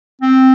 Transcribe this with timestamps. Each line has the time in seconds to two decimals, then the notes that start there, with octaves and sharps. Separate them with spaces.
0.21 C4